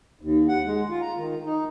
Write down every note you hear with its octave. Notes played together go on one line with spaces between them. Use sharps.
D#2
F#5
G#3
F4
A#5
D#3
D#4